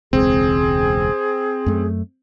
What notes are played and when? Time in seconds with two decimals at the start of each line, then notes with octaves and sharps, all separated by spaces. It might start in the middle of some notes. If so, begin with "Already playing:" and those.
0.13 E1 C#2 C4 G#4
1.66 F#2 A3